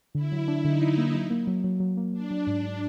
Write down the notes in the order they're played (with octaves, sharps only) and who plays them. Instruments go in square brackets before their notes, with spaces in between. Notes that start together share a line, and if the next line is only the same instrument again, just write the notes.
[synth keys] D3 [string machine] E4
[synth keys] F#3
D4
[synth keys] D3 [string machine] D#4
[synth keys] D4
A#3
F#3
A#3
F#3
F#3
F#3
A#3
[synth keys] F#3 [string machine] D4
[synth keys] F#3
G#2
G#2